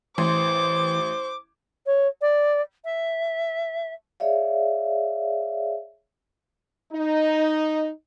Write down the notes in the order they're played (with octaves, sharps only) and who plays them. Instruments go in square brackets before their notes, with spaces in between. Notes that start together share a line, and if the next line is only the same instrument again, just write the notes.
[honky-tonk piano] A1 C6 [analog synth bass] E3 [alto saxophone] C5 [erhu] D6
[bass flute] C#5
D5
E5
[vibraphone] G#4 C#5 D5 E5 F5
[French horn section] D#4